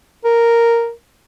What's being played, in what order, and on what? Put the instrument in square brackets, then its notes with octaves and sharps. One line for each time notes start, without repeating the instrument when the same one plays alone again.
[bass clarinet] A#4